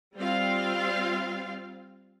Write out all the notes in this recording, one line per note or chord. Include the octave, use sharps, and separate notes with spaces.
G3 C4 F4 F5